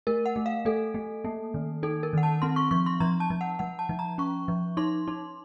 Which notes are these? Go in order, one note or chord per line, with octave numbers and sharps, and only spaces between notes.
A3 A#4
F#5
A3
F5
A3 A4
A3
A#3
D#3
D#4 A4
A#4
D#3 F#5
A5
C4 C6
C#6
F3 C#6
C6
F3 A#5
A5
F3
F#5
F3 F#5
A5
F3
A#5
C#4 C#6
F3
D#4 C6
D#4